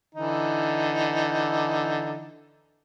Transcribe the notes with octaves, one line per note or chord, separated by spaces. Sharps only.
D3 E3 D#4